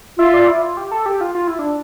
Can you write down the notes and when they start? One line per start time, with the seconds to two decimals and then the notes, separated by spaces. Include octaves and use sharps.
0.19 F4 E5
0.34 D5
0.48 E4
0.62 F4
0.77 G4
0.91 A4
1.06 G4
1.21 F4
1.35 F4
1.47 E4
1.59 D4